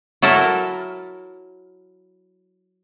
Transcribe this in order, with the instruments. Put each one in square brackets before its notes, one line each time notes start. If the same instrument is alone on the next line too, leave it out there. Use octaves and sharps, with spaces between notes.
[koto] F#3 E4 A4 A#4